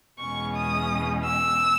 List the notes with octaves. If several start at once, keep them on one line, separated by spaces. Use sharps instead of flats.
E2 B2 G#3 C#4 C#6
D#6
E6